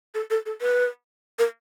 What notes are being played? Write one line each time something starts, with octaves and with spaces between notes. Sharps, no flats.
A4
A4
A4
B4
A#4